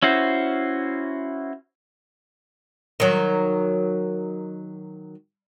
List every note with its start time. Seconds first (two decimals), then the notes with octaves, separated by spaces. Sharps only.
0.02 C#4 E4 F#4 C5
3.00 D#3 F#3